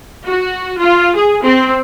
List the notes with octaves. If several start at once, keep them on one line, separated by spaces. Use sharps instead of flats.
F#4
F4
G#4
C4